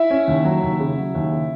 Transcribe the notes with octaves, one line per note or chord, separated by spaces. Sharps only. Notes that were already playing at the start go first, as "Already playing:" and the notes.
Already playing: E4 E5
C#4
D#2
F#3
D#2
C#3
F#3
D#2
C#3